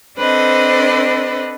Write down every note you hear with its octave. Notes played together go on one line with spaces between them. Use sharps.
C4 D4 A4 B4 C5 D#5